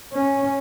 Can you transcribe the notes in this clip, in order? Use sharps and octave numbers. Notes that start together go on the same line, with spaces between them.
C#4